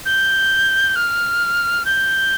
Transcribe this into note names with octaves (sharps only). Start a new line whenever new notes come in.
G6
F6
G6